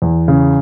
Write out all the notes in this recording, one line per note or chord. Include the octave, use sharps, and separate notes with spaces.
E2
C#3